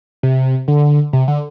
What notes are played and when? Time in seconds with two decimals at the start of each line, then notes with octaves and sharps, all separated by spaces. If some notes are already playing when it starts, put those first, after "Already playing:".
0.23 C3
0.68 D3
1.13 C3
1.28 D3